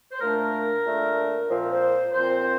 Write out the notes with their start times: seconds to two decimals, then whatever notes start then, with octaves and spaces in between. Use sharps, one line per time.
0.12 C5
0.21 A#2 A3 D4 A#4
0.86 A#2 A3 D4
1.50 A#2 F3 C4 C5
1.59 A#4
1.69 C5
2.14 A#2 F3 C4 C5